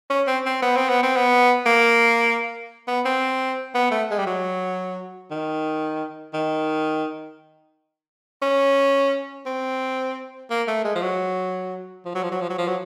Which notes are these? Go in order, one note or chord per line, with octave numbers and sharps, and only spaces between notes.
C#4
C4
C4
B3
C4
B3
C4
B3
A#3
B3
C4
B3
A3
G#3
G3
F#3
D#3
D#3
C#4
C4
A#3
A3
G#3
F3
F#3
F3
F#3
F3
F#3
F3
F#3
F3
F#3